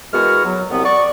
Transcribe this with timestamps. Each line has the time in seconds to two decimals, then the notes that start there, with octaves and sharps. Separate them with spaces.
0.13 E3 G#3 B3 F#4 A#4 F6
0.45 F#3
0.71 C2 B3
0.85 F#4 D5 C#6